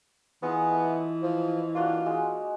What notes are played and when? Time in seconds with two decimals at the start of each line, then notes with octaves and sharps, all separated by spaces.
0.43 E3 B3 F4 G#4 D#5
0.72 A3
1.23 F3
1.75 A#3 D4 F4 F#4
2.06 G#3 D#4